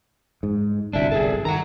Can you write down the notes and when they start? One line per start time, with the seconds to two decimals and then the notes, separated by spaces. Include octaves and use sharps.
0.43 G#2
0.93 D1 G1 C2 D4 E5
1.11 G#4 A4
1.45 D#3 F#5 A#5